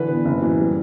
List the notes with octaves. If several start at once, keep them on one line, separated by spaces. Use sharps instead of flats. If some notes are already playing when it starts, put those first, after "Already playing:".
Already playing: D3 E3 B4
B3
F#1
E3
G3